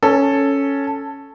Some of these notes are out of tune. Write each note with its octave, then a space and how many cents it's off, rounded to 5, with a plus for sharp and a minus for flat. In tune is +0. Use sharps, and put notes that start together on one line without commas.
C#4 +0 A4 +0